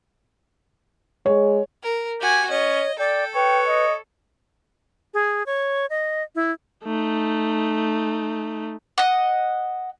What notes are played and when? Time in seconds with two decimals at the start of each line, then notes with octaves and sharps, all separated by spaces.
1.26 G#3 C#5
1.83 A#4
2.21 F#4 G4 G#5
2.50 C#4 C#5 D#5
2.99 A4 D5 G5
3.35 B4 C#5 G5
3.67 D#5
5.14 G#4
5.46 C#5
5.90 D#5
6.35 E4
6.84 A3 D#4
8.98 D#5 F#5